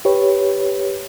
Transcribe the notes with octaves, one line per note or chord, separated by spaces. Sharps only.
G4 B4 C#5